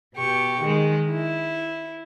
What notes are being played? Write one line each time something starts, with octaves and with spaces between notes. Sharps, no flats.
B2 G4 C#6
D#3 G#3
E4